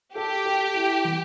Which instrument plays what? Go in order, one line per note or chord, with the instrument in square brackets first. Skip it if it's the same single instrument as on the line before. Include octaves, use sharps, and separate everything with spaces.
[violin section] G4 [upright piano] A4
[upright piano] A4
E4
E3